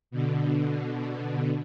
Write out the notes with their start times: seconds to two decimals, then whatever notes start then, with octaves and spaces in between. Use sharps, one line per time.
0.11 B2 D3